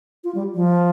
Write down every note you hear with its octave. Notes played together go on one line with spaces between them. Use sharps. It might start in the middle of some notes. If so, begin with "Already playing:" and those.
F4
G3
F3